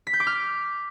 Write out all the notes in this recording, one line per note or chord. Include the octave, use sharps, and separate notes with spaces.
B6
G6
D6
F6